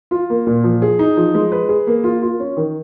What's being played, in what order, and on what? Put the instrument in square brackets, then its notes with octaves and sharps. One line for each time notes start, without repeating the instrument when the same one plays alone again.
[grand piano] F4
A#3
A#2
F3
G#4
D#4
F3
G#3
B4
G#4
A#3
F4
F4
C#4
D#3